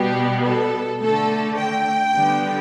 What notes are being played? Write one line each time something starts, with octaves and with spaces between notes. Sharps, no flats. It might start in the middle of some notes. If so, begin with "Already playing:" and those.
Already playing: B2 G3 B3 G4
A4
D3 A3 A4
G5
D3 G3 B3